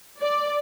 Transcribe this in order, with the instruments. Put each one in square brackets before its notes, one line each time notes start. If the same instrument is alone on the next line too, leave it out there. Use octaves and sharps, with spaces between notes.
[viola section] D5